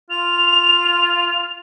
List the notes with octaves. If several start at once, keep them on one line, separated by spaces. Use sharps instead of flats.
F4 F7